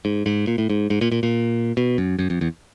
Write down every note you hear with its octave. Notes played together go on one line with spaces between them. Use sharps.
G#2
G#2
A#2
A2
G#2
G#2
A#2
A#2
A#2
B2
F#2
F#2
F2
E2